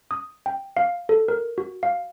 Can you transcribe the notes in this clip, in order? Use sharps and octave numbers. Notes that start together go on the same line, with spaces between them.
D#6
G5
F5
A4
A#4
F#4
F5